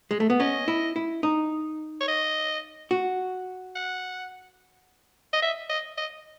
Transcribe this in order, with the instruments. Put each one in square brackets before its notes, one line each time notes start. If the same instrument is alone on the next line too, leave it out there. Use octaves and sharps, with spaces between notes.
[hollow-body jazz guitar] G#3
A3
B3
[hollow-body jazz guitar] C#4 [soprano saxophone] D#5
[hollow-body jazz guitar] E4
E4
D#4
[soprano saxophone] C#5
D#5
[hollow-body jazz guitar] F#4
[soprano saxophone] F#5
D#5
E5
D#5
D#5